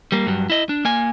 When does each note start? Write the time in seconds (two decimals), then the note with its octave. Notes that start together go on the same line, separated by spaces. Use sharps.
0.12 G3 A#3
0.27 G2 F#3
0.50 E4 D#5
0.69 D4
0.85 A#3 G#5